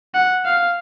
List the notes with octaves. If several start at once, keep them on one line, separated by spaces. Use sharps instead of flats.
F#5
F5